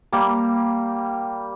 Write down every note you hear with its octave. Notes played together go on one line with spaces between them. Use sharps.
G3 A#3